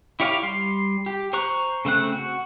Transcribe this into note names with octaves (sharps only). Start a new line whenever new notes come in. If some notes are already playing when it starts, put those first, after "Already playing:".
E4 G4 C#5 D5 F5
G3 C6
G4
C5 A#5 C#6 F#6
C#3 A3 C4 F#6
F#4